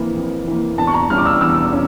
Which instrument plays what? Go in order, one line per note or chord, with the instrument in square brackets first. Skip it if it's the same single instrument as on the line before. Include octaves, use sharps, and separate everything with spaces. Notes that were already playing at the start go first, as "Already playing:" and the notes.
Already playing: [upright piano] F2 E3 A#3
F2
E3 A#3
E2 A5
C#6
A#5
E3 G3 C#4 F6
D6
E6
E2 E6
C#4